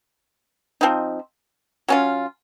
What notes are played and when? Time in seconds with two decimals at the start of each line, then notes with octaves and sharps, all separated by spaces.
0.81 F3 C4 D#4
1.88 F#3 C#4 F4